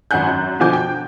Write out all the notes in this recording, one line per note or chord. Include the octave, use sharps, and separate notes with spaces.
G#1 F#2 F#5 G#5 F#6 G6
F#2
B2 D3 F3 G#5 D6 G6
G5